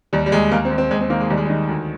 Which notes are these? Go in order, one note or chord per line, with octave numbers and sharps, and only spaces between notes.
D#2 G3
G3
D#2 G#3
D#2 A#3
C4
D#2
C4
D#2 G#3
C4
D#3 A#3
G#3
D#2 G3
G#3
G3
D#3
D2